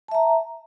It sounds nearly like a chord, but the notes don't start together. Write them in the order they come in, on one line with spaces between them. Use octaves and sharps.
A5 E5 A#5